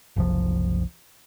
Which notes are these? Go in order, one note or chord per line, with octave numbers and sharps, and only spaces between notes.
F#1 C2 F3